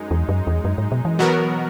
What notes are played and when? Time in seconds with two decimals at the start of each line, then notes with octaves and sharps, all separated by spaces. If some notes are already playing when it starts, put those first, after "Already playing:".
Already playing: F#2 G#3 D#4
0.11 E2
0.29 F#2
0.47 E2
0.65 F#2
0.78 G#2
0.92 B2
1.05 E3
1.19 B2 F#3 B3 F#4 A#4